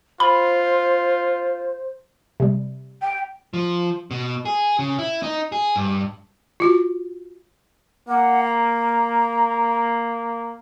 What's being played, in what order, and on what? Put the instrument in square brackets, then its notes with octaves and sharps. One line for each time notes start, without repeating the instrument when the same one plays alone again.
[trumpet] F4 [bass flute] C5 [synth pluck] B5
[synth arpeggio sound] C3 G3
[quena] G5
[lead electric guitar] F3
B2
G#4
C#3
E4
D#4
G#4
G2
[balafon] F4 F#4
[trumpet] A#3 [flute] F#5
[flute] A#5